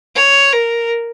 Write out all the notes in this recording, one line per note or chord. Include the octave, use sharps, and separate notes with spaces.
C#5
A#4